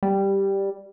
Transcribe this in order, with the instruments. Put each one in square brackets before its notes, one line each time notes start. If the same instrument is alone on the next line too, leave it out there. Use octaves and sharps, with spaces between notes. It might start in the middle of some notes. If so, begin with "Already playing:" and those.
[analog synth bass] G3